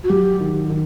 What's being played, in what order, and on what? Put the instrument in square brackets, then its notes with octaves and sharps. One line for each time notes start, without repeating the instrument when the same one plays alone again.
[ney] F#4
[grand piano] F#3 [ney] G4
[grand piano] D#3
D#3